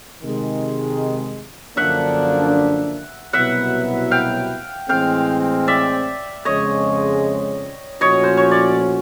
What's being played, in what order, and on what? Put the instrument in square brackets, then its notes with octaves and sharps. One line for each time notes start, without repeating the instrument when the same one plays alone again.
[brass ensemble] C3 D#3 G#3
[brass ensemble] F#2 D3 F3 A#3 D4 [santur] E5 F#5
[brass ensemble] C2 B2 F#3 B3 E4 [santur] E5 F#5
[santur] F5 G5
[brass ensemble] A2 E3 G#3 C4 [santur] F5 G5
[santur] D5 E5
[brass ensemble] F2 C#3 F3 G#3 [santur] C#5 D#5
[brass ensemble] A#2 F3 A3 C#4 F#4 [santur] C#5 D#5
[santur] C5
C#5
D5